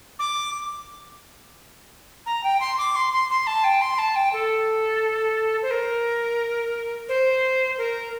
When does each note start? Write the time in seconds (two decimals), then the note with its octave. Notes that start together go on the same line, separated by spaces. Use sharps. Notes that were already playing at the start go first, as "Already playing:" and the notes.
0.19 D6
2.26 A#5
2.44 G5
2.61 C6
2.78 D6
2.96 C6
3.12 C6
3.30 C6
3.47 A5
3.64 G5
3.81 C6
3.98 A5
4.16 G5
4.33 A4
5.62 C5
5.71 A#4
7.09 C5
7.78 A#4